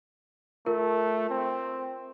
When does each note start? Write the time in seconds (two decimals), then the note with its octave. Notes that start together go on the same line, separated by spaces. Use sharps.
0.66 A3 F4 A#4
1.30 C4